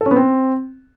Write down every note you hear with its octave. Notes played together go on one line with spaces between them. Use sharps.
A4
C#4
B3
C4